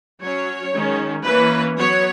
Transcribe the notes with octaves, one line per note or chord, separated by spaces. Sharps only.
F#3 C#4 C#5
D#3 G#3 C#4
E3 A#3 C#4 B4
F#3 B3 C#5